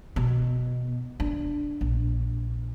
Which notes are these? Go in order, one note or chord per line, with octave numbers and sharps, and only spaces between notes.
B2
D4
A#1